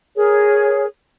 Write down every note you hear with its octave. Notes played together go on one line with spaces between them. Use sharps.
G#4 A#4 C#5